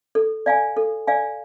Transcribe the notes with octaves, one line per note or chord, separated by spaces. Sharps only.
A4
D5 F5 G#5
A4
D5 F5 G#5